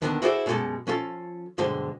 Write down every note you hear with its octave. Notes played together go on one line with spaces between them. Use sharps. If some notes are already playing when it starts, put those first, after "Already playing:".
D#2 D3 D#3 B3 C#4 D4
E4 F#4 G#4 A4 C5 D5
F#2 B2 G3 G#3 A4 A5
F3 C#4 F4 A4
B1 G2 D3 G#3 C5 A5